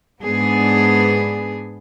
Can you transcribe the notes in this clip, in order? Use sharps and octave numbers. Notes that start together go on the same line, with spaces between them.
G#2 B3 D4 G#4